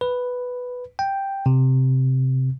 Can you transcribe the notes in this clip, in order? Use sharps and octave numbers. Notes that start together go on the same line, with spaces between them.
B4
G5
C3